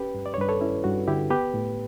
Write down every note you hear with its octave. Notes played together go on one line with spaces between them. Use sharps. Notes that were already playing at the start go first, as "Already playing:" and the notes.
Already playing: C#4 G4 B4
G2
D5
C#5
G2 B4
A4 C#5
C#4 E4
G2 F#4
D3 E4 G4
B3 G4 B4
A2